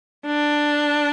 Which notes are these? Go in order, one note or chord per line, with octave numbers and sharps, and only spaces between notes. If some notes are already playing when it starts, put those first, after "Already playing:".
D4